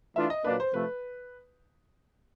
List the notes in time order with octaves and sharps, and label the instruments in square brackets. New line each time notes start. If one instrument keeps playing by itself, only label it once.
[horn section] E3 A3 D4 F4 [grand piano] E5
[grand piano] D#5
[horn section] A#2 F#3 A#3 D4 [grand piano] B4
[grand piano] C5
[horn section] C3 F3 A3 [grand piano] B4